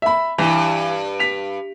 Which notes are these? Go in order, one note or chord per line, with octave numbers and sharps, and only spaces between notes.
E5 B5
G2 E3
B6 F7